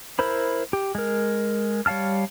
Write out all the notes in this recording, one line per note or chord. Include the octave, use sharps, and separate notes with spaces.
E4 A#4 C5 B5
G4
G#3 A#4
G3 C#5 F5 A5 F6